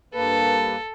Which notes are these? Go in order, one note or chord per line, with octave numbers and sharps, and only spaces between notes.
G2 A#3 A4 B4